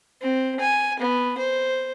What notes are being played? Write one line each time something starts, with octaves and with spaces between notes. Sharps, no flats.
C4
G#5
B3
C5